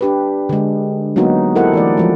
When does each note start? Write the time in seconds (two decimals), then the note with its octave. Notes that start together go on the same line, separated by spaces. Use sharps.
0.01 D4 G4 B4
0.49 D3 G#3
1.16 F#3 G#3 A#3 B3 D#4 F#4
1.56 E4 G4 A4 A#4 C5 F#5
1.74 E3 A3 D5
1.97 F3 G#3